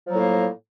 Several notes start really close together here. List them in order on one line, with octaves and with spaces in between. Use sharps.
F3 F#3 A#3 A2